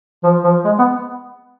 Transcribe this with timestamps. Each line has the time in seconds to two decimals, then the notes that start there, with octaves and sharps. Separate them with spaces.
0.24 F3
0.44 F3
0.65 G#3
0.79 B3